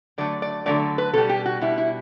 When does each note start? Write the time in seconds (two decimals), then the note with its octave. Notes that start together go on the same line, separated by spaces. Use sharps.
0.18 D3 F#3 A3 D5
0.42 D5
0.66 D3 F#3 A3 D5
0.98 B4
1.13 B2 G3 A4
1.29 G4
1.46 F#4
1.62 B2 G3 E4
1.78 E4